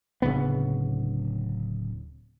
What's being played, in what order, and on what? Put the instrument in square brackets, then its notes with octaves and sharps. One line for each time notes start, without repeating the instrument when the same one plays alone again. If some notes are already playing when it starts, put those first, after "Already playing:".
[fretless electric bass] D1 C#3 B3